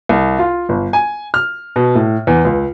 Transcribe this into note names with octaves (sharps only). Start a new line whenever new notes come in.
C2
F4
G1
G#5
F6
B2
A2
E2
C#2